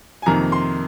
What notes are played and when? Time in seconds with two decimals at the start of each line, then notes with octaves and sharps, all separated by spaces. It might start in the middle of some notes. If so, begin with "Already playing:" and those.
0.22 G#5
0.26 F2 C3 D#3 A#3 A#5
0.52 C6